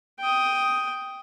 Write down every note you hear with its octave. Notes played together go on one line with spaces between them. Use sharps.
G5 D#6